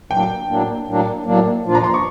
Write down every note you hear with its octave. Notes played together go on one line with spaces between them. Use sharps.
A2 F#3 A#3 D4 G5
A2 F#3 A#3 D4
A2 F#3 A#3 D4
A2 F#3 A#3 D4
A#2 F3 A#3 D4 F4
A#5
C6
C#6